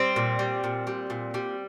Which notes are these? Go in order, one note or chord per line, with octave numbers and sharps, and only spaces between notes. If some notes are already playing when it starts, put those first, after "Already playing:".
Already playing: G3 C4
A#2
G3
A#2
G3
A#2
G3